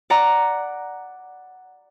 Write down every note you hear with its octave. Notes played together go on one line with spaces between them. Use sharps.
D5 F#5 A#5